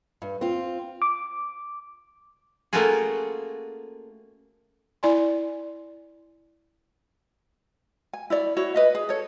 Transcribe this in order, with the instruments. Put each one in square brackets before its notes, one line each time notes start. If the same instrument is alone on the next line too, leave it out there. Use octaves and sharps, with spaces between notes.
[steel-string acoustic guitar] G2
C4 F4
[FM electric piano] D6
[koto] A3 A#3 C#4 F4 F#4 G#4
[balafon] E4 D5 G#5 C6
[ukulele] G#5
E4 C#5 D5
E4 F#4 C#5
B4 D#5 E5
G#4
A4 C#5